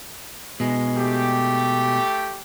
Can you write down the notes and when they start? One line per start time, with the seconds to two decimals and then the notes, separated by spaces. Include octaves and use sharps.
0.60 B2 G#3
0.97 A3 G4